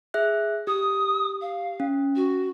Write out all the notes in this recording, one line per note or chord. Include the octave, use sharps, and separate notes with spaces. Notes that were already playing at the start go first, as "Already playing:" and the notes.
G#4 E5 F#6
G4 D#6
F5
C#4
F#4